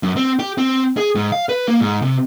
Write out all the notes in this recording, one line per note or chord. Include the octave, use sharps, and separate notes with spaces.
F#2
C4
G4
C4
G#4
G#2
F5
B4
A#3
G#2
C3